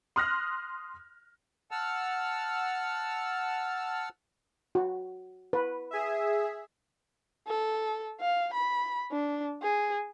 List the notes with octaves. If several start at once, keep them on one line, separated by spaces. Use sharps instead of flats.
C6 D#6 F6 F#6 A#6
F#5 A5 E6 F6
F#4
B4
G#4 E5
A4
F5
B5
D4
G#4